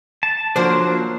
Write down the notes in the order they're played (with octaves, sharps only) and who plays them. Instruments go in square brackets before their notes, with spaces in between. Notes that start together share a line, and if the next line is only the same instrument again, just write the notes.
[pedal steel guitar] A5
[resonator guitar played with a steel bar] F3 F#3 C5 [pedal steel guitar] A#3 D4